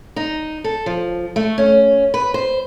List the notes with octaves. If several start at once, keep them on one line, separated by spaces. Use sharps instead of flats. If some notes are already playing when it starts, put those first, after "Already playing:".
D#4
A4
F3
A3
C#4
B4
C5